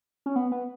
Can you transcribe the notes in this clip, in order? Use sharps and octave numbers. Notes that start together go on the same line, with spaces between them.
C#4
B3
B3